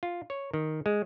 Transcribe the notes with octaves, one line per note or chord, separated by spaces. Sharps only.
F4
C#5
D#3
G#3